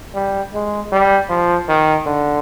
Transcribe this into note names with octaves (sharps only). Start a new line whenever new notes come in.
G3
G#3
G3
F3
D#3
D3